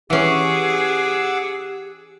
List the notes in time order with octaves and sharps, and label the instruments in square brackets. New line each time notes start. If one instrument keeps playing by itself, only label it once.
[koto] E3 C#4 [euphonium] G4 [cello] G#4 [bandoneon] F#5 D6 E6